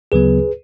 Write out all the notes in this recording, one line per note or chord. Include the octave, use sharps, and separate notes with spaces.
D2 C#3 F#3 B3 G#4 B4